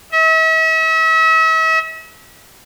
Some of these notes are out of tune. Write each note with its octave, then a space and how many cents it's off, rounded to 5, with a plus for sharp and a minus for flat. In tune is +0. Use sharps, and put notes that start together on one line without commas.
E5 -40